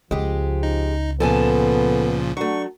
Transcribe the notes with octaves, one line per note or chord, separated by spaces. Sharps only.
C#2 F3 G#3 G4
D#4
A#2 C#3 F3 B3 A4 G#5 A5
F#3 A3 D4 C#6